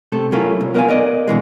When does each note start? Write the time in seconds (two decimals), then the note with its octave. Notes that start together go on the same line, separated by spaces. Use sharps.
0.12 C3 A3 A4
0.32 F#3 A3 A#3 C#4 E4 F4
0.61 C2
0.74 B3 A#4 B4 D#5 F5 G#5
0.88 A#4 B4 D5 D#5
1.28 D2 B2 E3 G#3